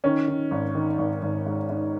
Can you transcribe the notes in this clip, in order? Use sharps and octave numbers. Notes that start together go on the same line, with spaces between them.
D#3 C#4
D#3
G#1
D#3
G#1
G#1
G#2
G#2